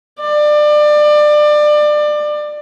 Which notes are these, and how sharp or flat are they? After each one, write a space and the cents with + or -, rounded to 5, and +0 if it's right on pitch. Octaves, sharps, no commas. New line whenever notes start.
D5 +25